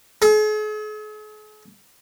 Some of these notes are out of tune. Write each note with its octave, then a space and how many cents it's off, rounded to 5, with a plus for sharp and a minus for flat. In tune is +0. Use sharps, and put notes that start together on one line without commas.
G#4 +45